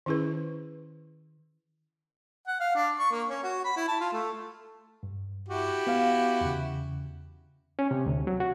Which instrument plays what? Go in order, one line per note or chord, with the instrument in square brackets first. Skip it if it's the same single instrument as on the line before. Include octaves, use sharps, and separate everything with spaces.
[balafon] D#3 C#4 E4 G#4 B4
[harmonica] F#5
F5
D4
C#6
A#3
C#4
F#4
B5
E4
A5
F4
A3
[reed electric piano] G2
[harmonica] E4 F#4 G4
[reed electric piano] B3 F5
E2 C#3
C#4
C3
D2
F#3
F#4